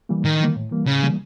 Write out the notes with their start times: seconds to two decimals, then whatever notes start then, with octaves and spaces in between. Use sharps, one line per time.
0.09 E3 G3 A#3
0.25 A2 D#3
0.40 E3 G3 A#3
0.56 A2
0.71 E3 G3 A#3
0.87 A2 C#3
1.02 E3 G3 A#3